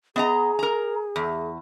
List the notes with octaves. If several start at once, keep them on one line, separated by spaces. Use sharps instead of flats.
B3 G#4 D#5 A#5
A#4 A#5
E2